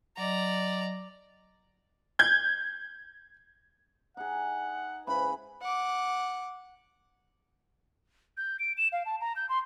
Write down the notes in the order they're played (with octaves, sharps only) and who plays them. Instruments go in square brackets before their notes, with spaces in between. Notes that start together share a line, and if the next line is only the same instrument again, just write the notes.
[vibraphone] F#3 D#5 [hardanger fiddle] D5 A#5
[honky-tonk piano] G6 G#6
[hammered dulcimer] D#4 G#4 [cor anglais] F#5
[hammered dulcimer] G#2 C#3 E4 [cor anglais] B4 [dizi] B5
[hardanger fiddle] F#5 D6
[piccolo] G6
D7
E7
F5
A5
A#5
G6
C6